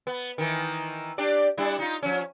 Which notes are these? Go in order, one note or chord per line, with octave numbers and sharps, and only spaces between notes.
B3
D#3 E3
D4 G4 D5
G3 D4 E4
D#4 F4
F3 C#4